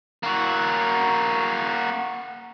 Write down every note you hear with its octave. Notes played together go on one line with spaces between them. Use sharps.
A#3 F#4